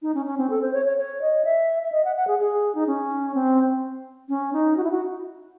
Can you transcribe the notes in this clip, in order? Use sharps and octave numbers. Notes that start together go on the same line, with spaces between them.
D#4
C#4
C#4
C4
A4
C5
C#5
C#5
C#5
D#5
E5
E5
D#5
F#5
F#5
G#4
G#4
D#4
C#4
C4
C#4
D#4
F#4
E4
F#4